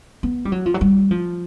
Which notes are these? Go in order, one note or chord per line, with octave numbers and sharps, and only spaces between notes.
B3
G3
F#3
F3
F#3
G3
F3